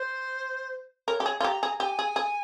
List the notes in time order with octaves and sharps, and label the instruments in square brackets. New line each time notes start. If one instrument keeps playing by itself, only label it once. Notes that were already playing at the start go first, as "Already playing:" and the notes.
Already playing: [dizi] C5
[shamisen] A#4 [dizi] C#5
[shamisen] G4
G#4
F4
[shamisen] G4 [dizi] A#5
[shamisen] G#4
[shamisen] G4 [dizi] G#5
[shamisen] G#4
G#4